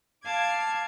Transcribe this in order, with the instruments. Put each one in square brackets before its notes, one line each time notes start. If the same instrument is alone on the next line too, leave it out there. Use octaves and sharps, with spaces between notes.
[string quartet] F5 A5 D6 G#6